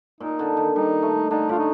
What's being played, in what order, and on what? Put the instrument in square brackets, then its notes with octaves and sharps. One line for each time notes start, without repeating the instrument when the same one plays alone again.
[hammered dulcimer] A#2 [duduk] D#4
[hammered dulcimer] D3
D#3
[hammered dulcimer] G3 [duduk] D#4
[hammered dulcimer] A3
[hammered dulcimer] D3 [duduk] D#4
[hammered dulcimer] A2 [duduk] F4
[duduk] D#4